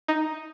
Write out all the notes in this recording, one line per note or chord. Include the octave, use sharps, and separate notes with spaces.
D#4